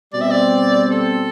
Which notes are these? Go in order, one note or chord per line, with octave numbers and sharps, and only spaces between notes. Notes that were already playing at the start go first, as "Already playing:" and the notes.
B2 G3 C4 D5
E5
D5
A4